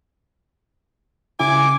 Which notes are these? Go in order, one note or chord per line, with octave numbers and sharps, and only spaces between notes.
C#3 E4 G#5 D6